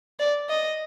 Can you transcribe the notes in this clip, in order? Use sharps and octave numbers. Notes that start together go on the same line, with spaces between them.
D5
D#5